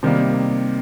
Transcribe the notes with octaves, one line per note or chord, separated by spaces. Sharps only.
C3 D#3 G3 A#3